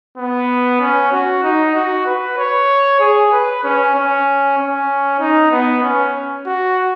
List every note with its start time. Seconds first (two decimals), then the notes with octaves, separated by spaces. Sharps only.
0.17 B3
0.81 C#4
1.12 F#4
1.44 D#4
1.75 F#4
2.06 B4
2.38 C#5
3.00 G#4
3.32 B4
3.64 C#4
3.95 C#4
4.58 C#4
5.20 D#4
5.52 B3
5.83 C#4
6.46 F#4